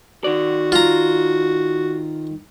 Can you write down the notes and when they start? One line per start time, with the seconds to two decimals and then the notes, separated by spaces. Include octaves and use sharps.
0.24 D#3 F#4 D5
0.72 F4 A#5